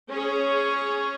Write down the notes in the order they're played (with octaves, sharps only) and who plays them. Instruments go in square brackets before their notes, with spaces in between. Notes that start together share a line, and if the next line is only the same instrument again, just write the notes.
[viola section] C#4 G#4 C#5